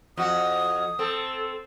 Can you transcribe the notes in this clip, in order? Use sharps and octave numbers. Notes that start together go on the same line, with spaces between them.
F2 F#4 D#6
C4 A4